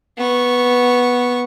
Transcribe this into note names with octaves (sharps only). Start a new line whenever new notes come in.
B3 C#6